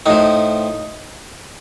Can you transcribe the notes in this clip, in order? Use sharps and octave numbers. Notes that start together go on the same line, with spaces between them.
A2 F3 D#4